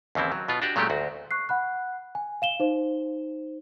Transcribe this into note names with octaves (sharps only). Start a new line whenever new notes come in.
D#2 C#3 E3 C4 E4
F#3
B2 B3 F4
D4 F#4 G4 D5
A#2 F#3 G#3 A3 C#4 G4
D2 F#4
C#6 F#6 C7
F#5 B5 F#6
G#5
F5 E7 G7
D#4 C5